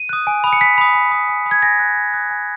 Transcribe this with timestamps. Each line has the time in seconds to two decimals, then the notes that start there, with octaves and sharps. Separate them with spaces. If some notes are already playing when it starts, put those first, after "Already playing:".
Already playing: D#7
0.09 D#6 F#6
0.27 G#5
0.44 B5 D#6
0.53 C#7
0.61 G#5 B6
0.78 B5 D#6
0.95 G#5
1.12 B5 D#6
1.29 G#5
1.46 B5 D#6
1.51 G#6
1.62 G#5 A#6
1.79 D#6 F#6
1.97 G#5
2.14 D#6 F#6
2.31 G#5